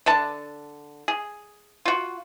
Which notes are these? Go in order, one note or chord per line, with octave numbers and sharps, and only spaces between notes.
D3 D4 A5
G#4
F4 F#4